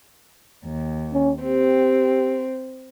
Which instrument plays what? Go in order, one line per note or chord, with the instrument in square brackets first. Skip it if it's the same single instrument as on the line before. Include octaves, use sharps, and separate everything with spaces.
[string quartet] D#2
[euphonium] C#4
[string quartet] C4 [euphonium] G4